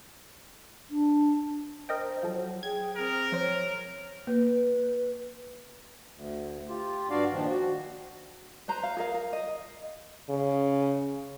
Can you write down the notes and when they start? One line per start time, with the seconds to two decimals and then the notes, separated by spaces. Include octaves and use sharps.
0.90 D4
1.89 A#4 C5 D#5 G5
2.23 F3 F#3 A4
2.63 G#4 G5 G#6
2.96 C4 G#4 A#4
3.32 F3 C5 C#5
4.27 A#3 B4
6.14 D2
6.69 F4 G4
7.10 G2 D4 F#4 D5 F5
7.33 A#2 D#3 F3 D4
7.50 F#4
8.68 B4 C5 A#5
8.83 F5
8.97 G#4 A#4 F5
9.14 A#4
9.33 D#5
10.30 C#3